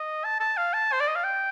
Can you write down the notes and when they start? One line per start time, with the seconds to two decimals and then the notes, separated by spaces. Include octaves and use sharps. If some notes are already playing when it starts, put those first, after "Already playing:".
Already playing: D#5
0.24 A5
0.40 A5
0.57 F5
0.74 A5
0.92 C5
1.00 D5
1.08 D#5
1.16 F5
1.24 G5